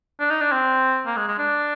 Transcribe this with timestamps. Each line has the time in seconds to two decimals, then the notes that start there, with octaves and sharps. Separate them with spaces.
0.20 D4
0.31 D#4
0.42 D4
0.52 C4
1.06 A#3
1.17 G#3
1.28 G#3
1.39 D4